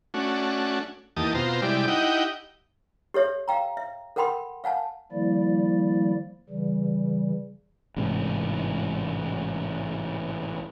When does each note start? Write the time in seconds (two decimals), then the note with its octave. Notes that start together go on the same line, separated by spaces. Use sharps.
0.14 A3 C#4 D4 F#4
1.16 E2 D#3 A#3 G4 A5 D#6
1.34 B2 C4 F4 C5 A#5
1.62 C3 G3 G#3 E4 G4 D5
1.88 D#4 E4 G4 D#5 F#5 G5
3.14 G4 A4 C#5 E5
3.48 F5 G5 A#5
3.77 E5
4.16 A4 A#4 F#5 G5 B5 C6
4.64 F5 F#5 G#5 A5
5.12 D#3 F3 G3 A#3 E4 D5
6.49 C#3 E3 G3
7.97 A1 G#2 C3